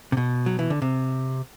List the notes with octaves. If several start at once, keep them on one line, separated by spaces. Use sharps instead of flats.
C3
B2
F#3
E3
D3
C3